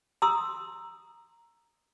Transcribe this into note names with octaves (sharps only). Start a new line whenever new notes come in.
A#5 C6 D#6 E6